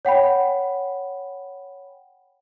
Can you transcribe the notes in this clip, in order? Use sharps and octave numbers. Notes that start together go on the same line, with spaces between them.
C#5 F#5 G5 B5